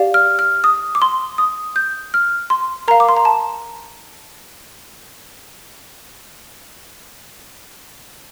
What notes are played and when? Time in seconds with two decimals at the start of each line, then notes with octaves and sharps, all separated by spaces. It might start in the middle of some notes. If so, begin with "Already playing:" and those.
Already playing: G4 D5 F5
0.14 F6
0.39 F6
0.64 D#6
0.95 D6
1.02 C6
1.38 D#6
1.76 G6
2.14 F6
2.50 C6
2.88 A#4 F5 A#5
3.00 D6
3.09 C6
3.17 A#5
3.25 A5